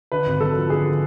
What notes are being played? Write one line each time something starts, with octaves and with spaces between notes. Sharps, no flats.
D3 B4
G#1
F#2 A4
F3
D3 G#4